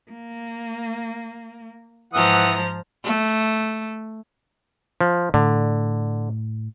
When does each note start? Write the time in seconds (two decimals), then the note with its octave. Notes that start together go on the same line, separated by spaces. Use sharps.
0.11 A#3
2.14 G#2 E3 F3 F#5 A#5 D#6
3.04 A3
5.01 F3
5.34 A2 D3